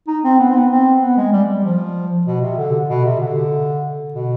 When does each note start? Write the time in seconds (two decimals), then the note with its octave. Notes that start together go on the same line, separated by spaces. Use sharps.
0.08 D#4
0.24 C4
0.39 B3
0.48 C4
0.56 B3
0.71 C4
1.02 B3
1.17 G#3
1.32 G3
1.49 G3
1.64 F3
2.27 B2
2.42 C3
2.57 D3
2.90 B2
3.05 C3
3.20 D3
4.14 B2